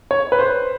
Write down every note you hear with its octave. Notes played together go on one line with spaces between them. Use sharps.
C#5
B4
C5